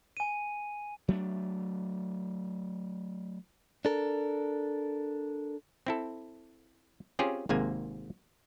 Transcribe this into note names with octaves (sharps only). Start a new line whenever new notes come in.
G#5 D#7
F#3 A3 B3 D4
D4 A4 A#4
C4 E4 A4
C4 C#4 F4 G4 G#4
G#1 G#2 C3 A#3 G#5